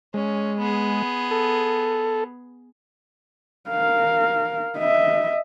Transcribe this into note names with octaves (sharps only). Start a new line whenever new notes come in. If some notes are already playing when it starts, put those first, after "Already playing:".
G#3 C#4
B3 G#4
A4
A#4 F5
D#5 E5